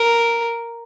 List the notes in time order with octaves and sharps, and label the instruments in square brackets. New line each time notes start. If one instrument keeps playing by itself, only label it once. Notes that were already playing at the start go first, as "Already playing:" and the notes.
Already playing: [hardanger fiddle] A#4